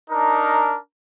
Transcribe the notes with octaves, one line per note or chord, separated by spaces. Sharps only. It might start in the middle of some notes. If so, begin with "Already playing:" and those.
D4 D#4 A#4